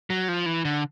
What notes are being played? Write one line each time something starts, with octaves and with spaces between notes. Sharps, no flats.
F#3
F3
E3
D3